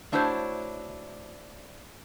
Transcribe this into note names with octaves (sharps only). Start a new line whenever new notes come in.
A3 D4 E4 F#4 C5 C#5